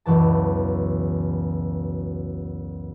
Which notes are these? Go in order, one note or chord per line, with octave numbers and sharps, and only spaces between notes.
E1 C#2 F#2 E3 A5